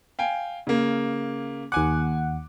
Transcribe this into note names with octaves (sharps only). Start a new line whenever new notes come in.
F5 G5 G#5
C#3 A#3
D#2 F#5 G#5 D6